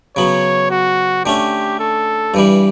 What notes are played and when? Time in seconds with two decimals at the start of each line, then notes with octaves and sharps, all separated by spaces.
0.16 C#3 F#3 B3 C#5
0.71 F#4
1.25 D3 A3 C#4 G4
1.80 A4
2.34 G2 E3 G3